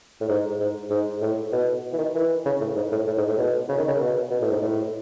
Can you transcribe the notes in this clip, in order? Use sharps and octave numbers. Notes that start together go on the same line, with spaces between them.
A2
G#2
G#2
G#2
A2
B2
E3
D#3
E3
C#3
A2
G#2
A2
A2
G#2
A2
B2
C#3
D#3
C#3
B2
B2
A2
G#2
A2